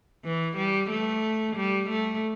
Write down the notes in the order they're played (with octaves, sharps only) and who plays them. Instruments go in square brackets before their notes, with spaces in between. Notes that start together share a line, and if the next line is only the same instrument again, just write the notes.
[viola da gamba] E3
G3
A3
G3
A3